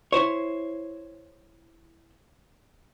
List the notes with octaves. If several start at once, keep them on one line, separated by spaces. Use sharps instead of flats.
E4 C5 C#5